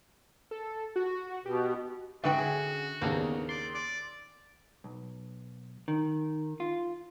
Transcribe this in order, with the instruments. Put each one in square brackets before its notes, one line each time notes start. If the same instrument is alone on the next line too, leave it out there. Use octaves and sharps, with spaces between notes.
[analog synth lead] A4
F#4
[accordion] B2 [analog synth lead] G4
[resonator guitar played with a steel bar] G#2 B4 G5 [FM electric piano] D3 C#4 [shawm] F#4 [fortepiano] E5 C#6
[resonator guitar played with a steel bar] G#4
[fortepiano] D#2 C#3 [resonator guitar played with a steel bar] A#3 [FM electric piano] B3 D4
[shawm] D5 [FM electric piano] C6
[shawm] D5
[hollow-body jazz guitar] B1
D#3
F4